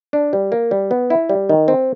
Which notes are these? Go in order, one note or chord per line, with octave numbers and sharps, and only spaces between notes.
D4
G3
A#3
G3
B3
E4
G3
D#3
C4